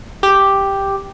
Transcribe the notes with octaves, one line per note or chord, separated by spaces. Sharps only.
G4